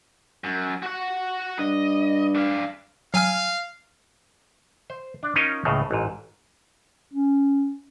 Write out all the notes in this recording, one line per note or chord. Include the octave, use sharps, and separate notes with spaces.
F#2
F#4 F#5
G2 D#5
D4 F5
F#3 F5 G#5 F6
C5
D4 D5
C#4 D#4 F4 A#4 C#5 D#5
C#2 A2 C#3
A1 G#2
C#4